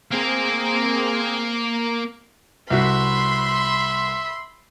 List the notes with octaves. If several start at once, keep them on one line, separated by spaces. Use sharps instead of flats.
A#3 C4 G#4 A#4
C2 F#4 E5 B5 C6